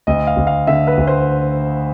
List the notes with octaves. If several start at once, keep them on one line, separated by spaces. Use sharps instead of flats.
D2 D#5
F5
D2
F5
D3 E5
B4
D2
C5